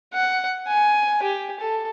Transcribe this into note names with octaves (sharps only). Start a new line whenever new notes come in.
F#5
G#5
G4
A4